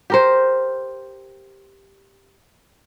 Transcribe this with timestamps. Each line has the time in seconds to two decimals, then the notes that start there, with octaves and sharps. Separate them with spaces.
0.10 G4 A#4 C5